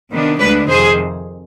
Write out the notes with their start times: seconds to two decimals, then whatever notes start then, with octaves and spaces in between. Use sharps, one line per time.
0.11 C3 D#3 B3 D4
0.39 D2 D3 G#3 D4 G4 B4
0.69 F2 C3 D#3 G#4 C5